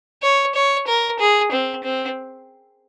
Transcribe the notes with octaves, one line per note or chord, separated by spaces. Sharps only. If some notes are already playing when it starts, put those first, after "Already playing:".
C#5
C#5
A#4
G#4
C4
C4